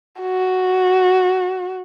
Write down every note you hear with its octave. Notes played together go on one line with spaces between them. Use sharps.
F#4